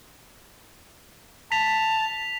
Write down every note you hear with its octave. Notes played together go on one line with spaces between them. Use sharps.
A5 B6 F7